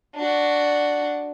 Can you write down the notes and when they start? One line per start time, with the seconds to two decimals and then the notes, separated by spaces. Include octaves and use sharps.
0.16 D4 F#4